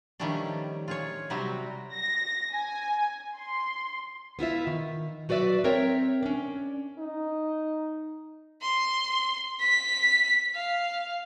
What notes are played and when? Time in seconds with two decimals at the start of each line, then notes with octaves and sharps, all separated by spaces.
0.20 D#3 F3 G3 A3 C#4 D4
0.88 F4 G#4 C#5
1.30 C3 F#3 G3 C4 F#4
1.94 A#6
2.53 G#5
3.37 C6
4.39 B3 E4 F4 E5
4.67 D#3
5.29 F#3 F#4 B4 D5 E5
5.64 C4 A#4 C#5 E5 G5
6.23 C#4 D4
6.98 D#4
8.61 C6
9.59 B6
10.55 F5